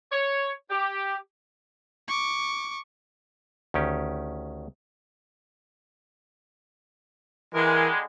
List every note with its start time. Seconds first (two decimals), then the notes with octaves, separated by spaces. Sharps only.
0.12 C#5
0.70 G4
2.08 C#6 D6
3.74 D2 D#3 C#4 G4
7.53 D3 E3 G3 G#3 A#4